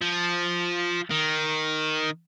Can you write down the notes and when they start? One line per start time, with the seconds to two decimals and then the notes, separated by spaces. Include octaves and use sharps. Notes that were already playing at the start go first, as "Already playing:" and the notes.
0.01 F3
1.10 D#3